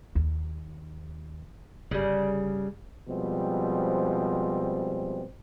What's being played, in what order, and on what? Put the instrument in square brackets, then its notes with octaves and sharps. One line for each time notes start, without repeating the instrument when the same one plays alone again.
[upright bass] D#2
[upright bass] G1 [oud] C#3 G3
[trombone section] B2 F3 G3 G#3 C4